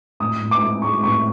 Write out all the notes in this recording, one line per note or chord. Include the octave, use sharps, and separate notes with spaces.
A2 D#6
A2
D6
A2
G#3 C#6
A2 C#6